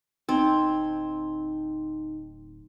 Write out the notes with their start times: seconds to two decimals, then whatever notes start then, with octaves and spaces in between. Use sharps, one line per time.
0.29 D1 C4 D#4